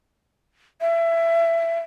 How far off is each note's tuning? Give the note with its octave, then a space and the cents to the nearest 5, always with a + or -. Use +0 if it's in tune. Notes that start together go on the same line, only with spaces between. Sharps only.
E5 +20